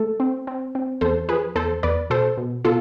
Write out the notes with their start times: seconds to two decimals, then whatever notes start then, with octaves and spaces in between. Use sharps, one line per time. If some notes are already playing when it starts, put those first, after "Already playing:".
Already playing: A3 A4
0.20 C4
0.47 C4
0.75 C4
1.01 E2 A4 C5
1.28 F3 G#4 B4
1.55 E2 A4 C5
1.83 E2 B4 D5
2.10 B2 A4 C5
2.37 B2
2.65 B2 F4 A4